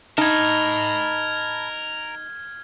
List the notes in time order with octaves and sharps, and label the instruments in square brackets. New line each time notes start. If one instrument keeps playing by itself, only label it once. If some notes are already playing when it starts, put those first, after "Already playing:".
[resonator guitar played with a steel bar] D#4 [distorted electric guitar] A#4 [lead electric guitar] A5 B5 [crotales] F6 G#6